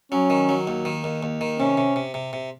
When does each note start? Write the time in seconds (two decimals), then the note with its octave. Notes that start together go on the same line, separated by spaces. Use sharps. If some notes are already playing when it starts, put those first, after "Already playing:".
0.12 F#3 C#4
0.30 D#3
0.49 F#3
0.67 D#2
0.85 D#3
1.04 D#2
1.23 D#2
1.41 D#3
1.59 C3 C#4
1.77 C3
1.96 C3
2.14 C3
2.33 C3